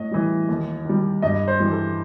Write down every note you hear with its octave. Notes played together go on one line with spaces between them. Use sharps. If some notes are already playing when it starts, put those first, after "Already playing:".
Already playing: A2 D#5
E3 G3
D#2
D#3 G3
G2 D#5
C5
E3 G3
A4